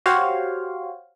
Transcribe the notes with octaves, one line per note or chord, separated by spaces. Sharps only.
F#4 G4 C5 C#5 F5